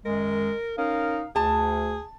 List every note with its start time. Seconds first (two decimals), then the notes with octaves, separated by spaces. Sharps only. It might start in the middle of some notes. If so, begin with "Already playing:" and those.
0.05 F#2 D#3 G#3 A#4
0.78 C#4 D#4 A#4 F5
1.36 D2 G#4 A5